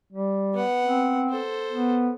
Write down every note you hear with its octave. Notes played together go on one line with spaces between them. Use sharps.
G3
B3 F#5
C4
A4 C5
B3